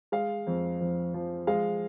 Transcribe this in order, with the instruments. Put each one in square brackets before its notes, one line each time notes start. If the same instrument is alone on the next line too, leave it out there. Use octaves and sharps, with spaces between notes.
[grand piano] G#3 F5
F2
F2
F3
G#3 F5